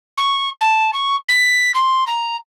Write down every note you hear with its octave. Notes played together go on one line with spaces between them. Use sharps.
C#6
A5
C#6
B6
C6
A#5